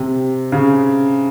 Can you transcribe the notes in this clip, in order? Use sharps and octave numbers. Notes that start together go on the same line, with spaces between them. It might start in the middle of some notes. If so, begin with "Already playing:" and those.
Already playing: C3
C#3